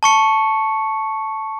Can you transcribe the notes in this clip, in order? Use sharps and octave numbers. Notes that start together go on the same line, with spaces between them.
A5 C#6 C#7